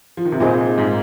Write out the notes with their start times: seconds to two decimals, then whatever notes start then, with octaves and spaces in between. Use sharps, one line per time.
0.17 F3
0.25 D#3
0.32 C3
0.40 A#2 C4 D#4 G#4 C5
0.78 G#2